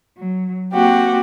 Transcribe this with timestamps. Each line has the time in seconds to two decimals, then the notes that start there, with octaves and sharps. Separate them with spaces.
0.16 F#3
0.73 A#3 C4 F#4 G4 F#5